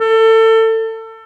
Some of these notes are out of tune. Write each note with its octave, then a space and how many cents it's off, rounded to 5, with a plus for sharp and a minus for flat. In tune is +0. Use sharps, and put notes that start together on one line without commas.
A4 +25